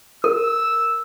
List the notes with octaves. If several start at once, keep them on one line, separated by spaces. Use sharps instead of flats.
A#4 E6